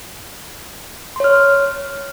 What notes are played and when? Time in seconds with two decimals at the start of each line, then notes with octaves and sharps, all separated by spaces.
1.16 C6
1.20 C#5
1.24 F6